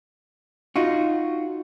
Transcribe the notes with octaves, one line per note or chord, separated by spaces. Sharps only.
D#4 F4 F#4